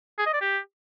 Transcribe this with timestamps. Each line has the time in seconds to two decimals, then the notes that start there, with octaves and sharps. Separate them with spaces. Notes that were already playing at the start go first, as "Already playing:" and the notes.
0.18 G#4
0.26 D#5
0.34 D5
0.41 G4